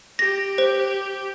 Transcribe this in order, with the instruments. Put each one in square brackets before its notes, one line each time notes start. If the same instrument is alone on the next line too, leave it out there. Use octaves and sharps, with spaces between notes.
[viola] G4 [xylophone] A#6
[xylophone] C5